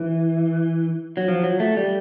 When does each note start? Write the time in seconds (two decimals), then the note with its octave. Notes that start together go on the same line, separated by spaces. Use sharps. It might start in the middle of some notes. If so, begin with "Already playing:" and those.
Already playing: E3
1.17 F#3
1.28 F3
1.44 F#3
1.60 A3
1.77 G3